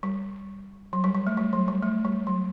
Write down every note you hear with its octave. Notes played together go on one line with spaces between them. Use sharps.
G3
F#3
G3
G3
A3
G3
F#3
G3
A3
G3
F#3